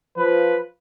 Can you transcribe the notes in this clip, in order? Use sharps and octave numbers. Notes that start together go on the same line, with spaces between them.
F3 B4